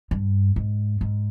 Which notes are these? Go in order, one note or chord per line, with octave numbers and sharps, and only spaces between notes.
G2
G#2
G#2